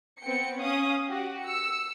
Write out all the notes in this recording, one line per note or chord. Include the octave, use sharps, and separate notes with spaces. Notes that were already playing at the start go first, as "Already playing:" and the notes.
B3 C4 G5 C#7
C#4 F5 D#6
F#4 G4 F#5
E6 C#7